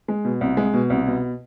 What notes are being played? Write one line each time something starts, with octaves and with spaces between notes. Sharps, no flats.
G#3
B2
C2
G#3
B2
C2
B2